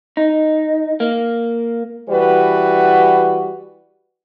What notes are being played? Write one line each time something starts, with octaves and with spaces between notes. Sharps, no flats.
D#4
A#3
E3 G3 F#4 B4